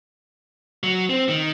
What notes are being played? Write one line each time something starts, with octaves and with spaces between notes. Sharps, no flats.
F#3
C4
D#3